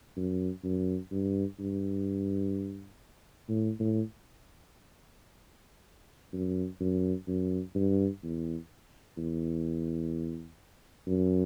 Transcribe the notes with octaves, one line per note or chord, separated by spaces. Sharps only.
F#2
F#2
G2
G2
A2
A2
F#2
F#2
F#2
G2
E2
E2
F#2